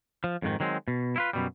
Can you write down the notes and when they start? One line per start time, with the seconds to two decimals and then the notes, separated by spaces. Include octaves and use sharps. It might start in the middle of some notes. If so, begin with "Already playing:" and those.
0.24 F3
0.42 F2 G#2 D#3
0.60 D#3 F#3 G#3 C4
0.88 B2
1.16 E4 F4 B4
1.33 F#2 B2 G3